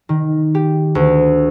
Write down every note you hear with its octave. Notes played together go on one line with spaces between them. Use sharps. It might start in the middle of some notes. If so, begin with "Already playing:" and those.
D#3
G4
D2